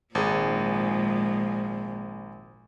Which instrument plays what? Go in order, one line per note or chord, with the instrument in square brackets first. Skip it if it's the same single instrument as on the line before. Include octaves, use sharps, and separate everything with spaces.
[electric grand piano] G#1 G#4 [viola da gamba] A#2 F3 G#3